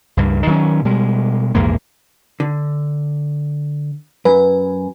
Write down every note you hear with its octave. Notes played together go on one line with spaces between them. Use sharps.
C#2 G2
D#3 F#3 G#3 C#4
B2 G3 G#3
A#1 E2 G#2 A#3
D3
F#2 B4 G#5